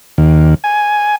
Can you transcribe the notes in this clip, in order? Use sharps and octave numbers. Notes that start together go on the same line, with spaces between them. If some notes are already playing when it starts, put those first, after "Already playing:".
D#2
G#5